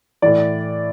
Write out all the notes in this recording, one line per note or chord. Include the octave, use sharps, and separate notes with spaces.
A2 E3 D5